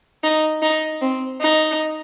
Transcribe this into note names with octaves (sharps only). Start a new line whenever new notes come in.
D#4
D#4
C4
D#4